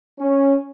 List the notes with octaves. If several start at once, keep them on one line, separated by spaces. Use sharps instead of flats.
C#4